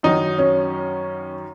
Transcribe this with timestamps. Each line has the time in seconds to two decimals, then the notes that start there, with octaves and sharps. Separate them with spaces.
0.03 F#2 D#3 F#3 D#4
0.38 C#4